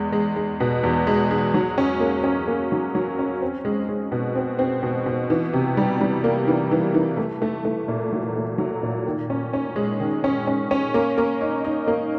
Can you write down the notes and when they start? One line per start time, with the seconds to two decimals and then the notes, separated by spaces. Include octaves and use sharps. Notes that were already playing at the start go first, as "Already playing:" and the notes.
Already playing: E2 G#3
0.12 G#3
0.36 G#3
0.60 B2
0.83 E2
1.07 G#3
1.31 G#3
1.54 F#3
1.78 C#4
2.00 A#3
2.24 C#4
2.48 A#3
2.72 F#3
2.95 F#3
3.19 C#4
3.42 C4
3.65 G#3
3.89 G#3
4.12 B2
4.36 C4
4.59 C4
4.83 B2
5.06 B2
5.30 E3
5.53 C3
5.77 G3
6.00 G3
6.24 A#3
6.48 E3
6.71 E3
6.95 E3
7.17 A3
7.42 A3
7.65 A3
7.88 A#2
8.12 F#3
8.36 A3
8.58 F#3
8.83 A#2
9.06 D#3
9.30 C#4
9.53 C#4
9.76 G#3
10.00 D#3
10.24 C#4
10.47 C#4
10.71 C#4
10.94 A#3
11.18 A#3
11.41 D#4
11.65 D#4
11.87 A#3